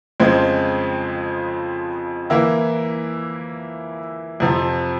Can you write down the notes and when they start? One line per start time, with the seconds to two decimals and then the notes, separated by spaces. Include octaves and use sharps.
0.20 F2 C#3 F3 G#3 C4
2.30 E3 A#3 E4
4.40 F2 C3 F3